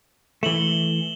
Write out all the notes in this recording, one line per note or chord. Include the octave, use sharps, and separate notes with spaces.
E3 A3 E7 F#7 G7